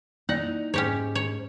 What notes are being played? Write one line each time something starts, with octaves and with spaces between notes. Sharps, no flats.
A#3 D#4 D5 F#5
G#2 C#4 G4 C#5
C#5